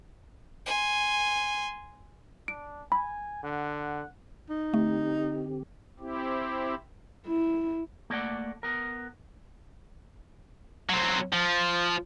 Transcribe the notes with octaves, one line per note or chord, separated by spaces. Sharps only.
G#5 C6
D4 D7
G#5 B5
D3 F#5
D#4
D3 A3 C4 G4
C4 E4 G4
E4
A3 A#3 D5 F#5
B3 A#4
F#3 C4
F3